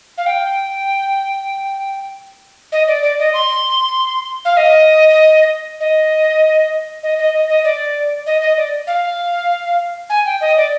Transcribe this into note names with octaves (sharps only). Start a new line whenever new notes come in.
F5
G5
D#5
D5
D5
D#5
C6
F5
D#5
D#5
D#5
D#5
D#5
D#5
D5
D#5
D#5
D5
F5
G#5
G5
D#5
D5